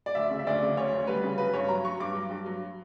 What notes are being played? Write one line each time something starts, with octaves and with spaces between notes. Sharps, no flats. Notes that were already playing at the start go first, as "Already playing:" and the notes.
D5
D2 E5
C#3
E5
D2 D5
C#3
D2 C#5
D2
G3 B4
C#3
F#3 B4
G2 C#5
F#3 A#5
F#3 C#6
G2 D6
F#3
G2
F#3